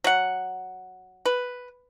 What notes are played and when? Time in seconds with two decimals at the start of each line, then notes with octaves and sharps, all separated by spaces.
0.04 F#3 F#5
1.25 B4